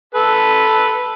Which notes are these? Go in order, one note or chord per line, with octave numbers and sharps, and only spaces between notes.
A4 B4